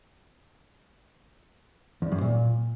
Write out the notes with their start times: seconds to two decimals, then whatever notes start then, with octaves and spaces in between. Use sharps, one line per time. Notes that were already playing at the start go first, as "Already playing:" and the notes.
2.02 E2
2.12 F#2
2.21 A#2